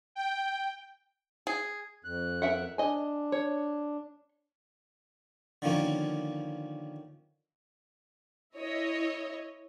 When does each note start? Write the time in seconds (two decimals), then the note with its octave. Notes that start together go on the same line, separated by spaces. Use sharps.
0.15 G5
1.47 G#4
2.04 F2 F#6
2.42 A#4 E5 F#5
2.78 D4 D#5 G#5
3.32 C#5
5.62 D3 D#3 F3 A#3 C#4
8.56 E4 C#5 D#5